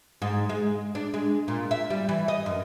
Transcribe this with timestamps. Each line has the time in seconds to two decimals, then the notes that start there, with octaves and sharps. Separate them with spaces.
0.22 G#2
0.49 G#3
0.95 D4
1.14 G#3
1.48 A#2
1.71 E5
1.90 G3
2.09 E3
2.28 D#5
2.46 F#2